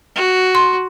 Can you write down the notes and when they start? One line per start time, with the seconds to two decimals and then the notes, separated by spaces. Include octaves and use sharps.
0.16 F#4
0.55 C6